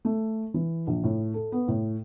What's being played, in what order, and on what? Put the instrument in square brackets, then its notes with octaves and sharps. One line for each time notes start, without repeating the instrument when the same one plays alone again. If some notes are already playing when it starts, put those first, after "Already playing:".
[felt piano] A3
E3
A#1
A2
A4
B3
A2